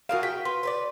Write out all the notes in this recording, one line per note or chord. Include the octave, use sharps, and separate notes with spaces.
F4 F#4 G#4 A#4 F5
G5 B6
B4 C6
B4 C5 D5